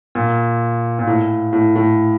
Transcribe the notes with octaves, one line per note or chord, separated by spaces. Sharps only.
A#2
A#2
A2
A2
A2